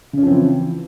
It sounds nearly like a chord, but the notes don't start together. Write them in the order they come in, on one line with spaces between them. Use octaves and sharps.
C#3 C#4 F3 C4 E3